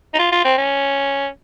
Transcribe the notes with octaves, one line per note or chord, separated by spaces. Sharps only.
D#4
F4
F4
C4
C#4